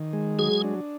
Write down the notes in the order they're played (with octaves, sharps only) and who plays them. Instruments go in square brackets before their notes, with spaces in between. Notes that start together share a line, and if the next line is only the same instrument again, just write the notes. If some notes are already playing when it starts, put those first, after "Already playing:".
Already playing: [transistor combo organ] D#3
G#3
[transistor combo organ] F#3 [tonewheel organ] G#4
[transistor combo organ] D4